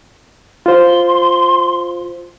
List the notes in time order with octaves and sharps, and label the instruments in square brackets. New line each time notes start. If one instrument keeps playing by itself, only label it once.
[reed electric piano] F4 C5 [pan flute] C6